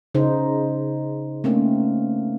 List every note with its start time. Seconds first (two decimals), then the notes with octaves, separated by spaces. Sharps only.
0.15 C#3 D#4 C5
1.44 A3 A#3 C4 C#4